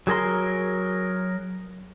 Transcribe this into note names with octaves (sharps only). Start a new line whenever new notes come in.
F#3 G#4 A#4 C6